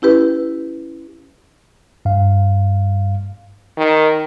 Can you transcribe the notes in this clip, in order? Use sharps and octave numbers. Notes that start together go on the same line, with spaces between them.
C#4 E4 G4 B4
G2 F5
D#3